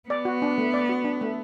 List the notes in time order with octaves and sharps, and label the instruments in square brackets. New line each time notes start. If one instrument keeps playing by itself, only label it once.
[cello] B3 [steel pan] D5
[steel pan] F#4
D4
A3
D5
F#4
D4
A3